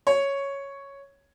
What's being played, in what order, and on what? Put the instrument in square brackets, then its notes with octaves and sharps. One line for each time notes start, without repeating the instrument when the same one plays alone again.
[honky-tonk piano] C#5